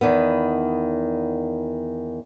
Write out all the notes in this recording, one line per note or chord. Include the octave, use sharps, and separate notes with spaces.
E2 D#3 B3